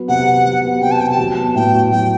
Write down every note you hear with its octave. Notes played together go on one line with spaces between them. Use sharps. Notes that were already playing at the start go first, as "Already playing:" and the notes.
Already playing: F#3 B3
C3 F#5
C3
F#3
B3
C3 G5
A5
C3 G5
A5
F#3
B3
A2 G5
F#4
F#3 G5